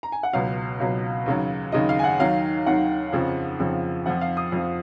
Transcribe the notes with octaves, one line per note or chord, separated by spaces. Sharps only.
A#5
G#5
F#5
C#2 B2 F#3 F5
C#2 B2 F#3
D#2 C#3 F#3
D#2 C#3 F#3 D#5
F5
G#5
F#5
D#2 D#3 F#3 F5
D#2 D#3 F#3 F#5
F2 C#3 F3
F2 C#3 F3
F2 F3 F#5
F5
D#6
F2 F3